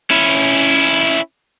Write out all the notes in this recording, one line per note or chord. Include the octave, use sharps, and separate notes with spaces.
C#4 E4